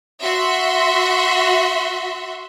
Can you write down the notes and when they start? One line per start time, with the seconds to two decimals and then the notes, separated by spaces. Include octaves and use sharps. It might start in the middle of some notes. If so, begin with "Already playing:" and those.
0.23 F#4 E5 C6